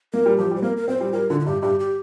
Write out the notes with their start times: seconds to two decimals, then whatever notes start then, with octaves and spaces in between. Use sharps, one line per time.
0.14 A#3 A#4
0.26 G3
0.38 F3 G4
0.51 G3
0.56 C5
0.62 A#3 A#4
0.77 A#4
0.88 C4 C5
1.00 G3
1.13 G3 A#4
1.30 D3 F4
1.40 F4
1.46 G2 G4
1.62 G2 G4
1.80 G4